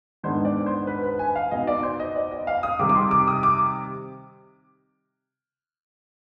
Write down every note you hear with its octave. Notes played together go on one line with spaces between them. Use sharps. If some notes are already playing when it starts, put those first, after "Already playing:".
G#2 D#3 B3 D4 C5
D5
C5
B4
B4
G#5
F5
B2 B3 D#4 D#5
D5
C5
D#5
D5
D#5
F5
D#6
C3 D#3 G3 D6
D6
C6
D6
D#6
D6